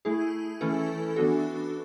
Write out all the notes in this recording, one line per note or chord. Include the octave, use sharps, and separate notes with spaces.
A3 E4 G#4
E3 A3 C#4 E4 A4
E3 B3 D4 F#4 A4